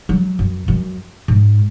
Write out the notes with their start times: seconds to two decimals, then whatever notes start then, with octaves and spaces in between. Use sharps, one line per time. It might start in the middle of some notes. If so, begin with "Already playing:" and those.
0.09 F#3
0.39 F#2
0.68 F#2
1.28 G#2